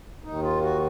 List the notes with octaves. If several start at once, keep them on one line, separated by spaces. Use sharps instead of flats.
D#2 D#3 D#4
F4
F#4